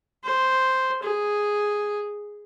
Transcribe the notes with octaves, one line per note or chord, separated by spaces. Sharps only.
C5
G#4